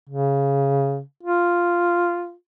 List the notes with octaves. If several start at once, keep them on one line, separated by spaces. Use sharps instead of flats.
C#3
F4